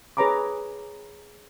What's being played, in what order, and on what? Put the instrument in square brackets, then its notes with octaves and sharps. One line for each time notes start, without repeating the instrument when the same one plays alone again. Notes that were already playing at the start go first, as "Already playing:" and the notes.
[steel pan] G#4 B4 C#5 A#5 B5 D6